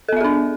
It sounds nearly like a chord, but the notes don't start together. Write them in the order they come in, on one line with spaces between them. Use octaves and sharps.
A4 B3 E5 G#4 D4